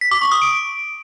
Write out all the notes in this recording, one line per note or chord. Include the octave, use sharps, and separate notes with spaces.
B6
D6
C#6
D#6
D7